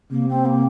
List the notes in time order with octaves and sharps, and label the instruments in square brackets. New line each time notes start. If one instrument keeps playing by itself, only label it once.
[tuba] C3 [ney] A#3
[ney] C4
A#3